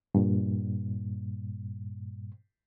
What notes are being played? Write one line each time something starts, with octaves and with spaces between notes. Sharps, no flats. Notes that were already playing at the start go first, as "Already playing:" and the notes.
G2 A#2